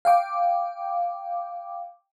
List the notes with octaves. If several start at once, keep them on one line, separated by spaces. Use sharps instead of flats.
F5 G5 D6